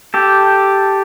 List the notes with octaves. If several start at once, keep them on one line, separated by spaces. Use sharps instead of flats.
G4 A4